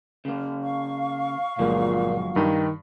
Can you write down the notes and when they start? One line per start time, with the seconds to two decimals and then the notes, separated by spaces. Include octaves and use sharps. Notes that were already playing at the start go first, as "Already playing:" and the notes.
0.25 C#3 A#3
0.62 F5 C#6
1.59 G1 A#2 F3 F#3 G#3 A#3
2.36 G2 D#3